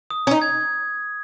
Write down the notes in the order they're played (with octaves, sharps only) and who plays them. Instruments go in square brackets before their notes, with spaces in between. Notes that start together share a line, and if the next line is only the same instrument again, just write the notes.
[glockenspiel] D#6
[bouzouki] C#4
D#4
[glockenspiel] G#6